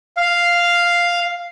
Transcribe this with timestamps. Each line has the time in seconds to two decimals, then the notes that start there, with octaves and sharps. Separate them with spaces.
0.17 F5